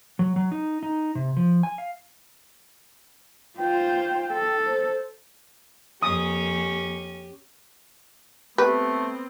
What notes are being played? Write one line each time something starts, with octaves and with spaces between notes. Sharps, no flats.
F#3
F#3
D#4
D#4
C3
F3
G#5
F5
F4 C5 G5
A4
C5
F2 A#3 C#4 G4 D#6
A3 B3 C4 G4 B4